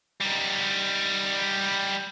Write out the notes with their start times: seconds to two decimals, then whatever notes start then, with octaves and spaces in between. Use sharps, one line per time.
0.21 G3 D#4